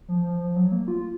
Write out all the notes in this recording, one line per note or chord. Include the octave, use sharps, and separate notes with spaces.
F3
F3
F3
F#3
A#3
F4